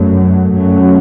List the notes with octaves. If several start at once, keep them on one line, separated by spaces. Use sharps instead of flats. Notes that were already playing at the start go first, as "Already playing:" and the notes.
Already playing: F#2 F#3 A3
F#2 F#3 A3 C#4